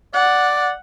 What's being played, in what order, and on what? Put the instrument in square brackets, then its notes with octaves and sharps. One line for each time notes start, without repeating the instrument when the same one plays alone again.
[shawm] D5 [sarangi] F#5